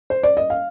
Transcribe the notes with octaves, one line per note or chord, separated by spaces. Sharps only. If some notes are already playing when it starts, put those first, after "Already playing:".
C5
D5
D#5
F5